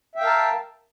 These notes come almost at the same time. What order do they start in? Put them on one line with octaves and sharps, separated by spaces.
E5 G5 F5 A#4 A5